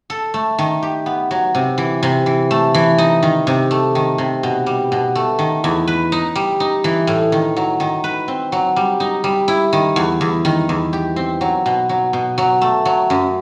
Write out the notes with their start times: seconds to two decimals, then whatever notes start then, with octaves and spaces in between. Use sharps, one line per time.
0.10 A4
0.34 A3
0.58 D#3
0.83 G4
1.06 B3
1.31 F#3
1.55 C3
1.78 E3
2.03 C3
2.26 E3
2.51 A3
2.74 E3
2.98 D#4
3.22 D#3
3.47 C3
3.71 A3
3.95 D#3
4.18 C3
4.43 B2
4.66 G3
4.92 B2
5.15 A3
5.39 D#3
5.64 E2
5.87 B4
6.12 D#4
6.35 G3
6.60 D#4
6.84 E3
7.07 A2
7.32 D#3
7.56 F#3
7.80 D#3
8.04 B4
8.28 C4
8.52 F#3
8.76 G3
9.00 D#4
9.24 G3
9.48 E4
9.73 D#3
9.96 E2
10.21 E2
10.45 D#3
10.69 E2
10.93 G4
11.16 C4
11.41 F#3
11.66 B2
11.89 F#3
12.13 B2
12.38 F#3
12.61 A3
12.85 F#3
13.10 F#2